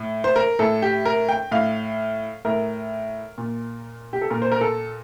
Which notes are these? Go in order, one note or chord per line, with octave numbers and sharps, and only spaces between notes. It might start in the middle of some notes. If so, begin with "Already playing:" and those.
Already playing: A2
C5
A#4
A2 A4
G4
A#4
G5
A2 F5
A2 A#4
A#2
G4
A4
A#2 A#4
C5
A#4
A4